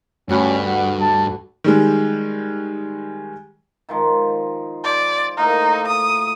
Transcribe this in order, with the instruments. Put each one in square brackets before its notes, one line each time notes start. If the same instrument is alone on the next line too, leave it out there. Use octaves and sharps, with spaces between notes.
[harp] D2 F#4 B5 [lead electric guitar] G2 [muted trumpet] C#4
[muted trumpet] F#5
A5
[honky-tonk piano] D#3 G3 G#3
[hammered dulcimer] D#3 F3 G#3
[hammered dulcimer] C5 [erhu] D5
[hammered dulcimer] A2 A#3 F5 [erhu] D#4
[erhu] D#6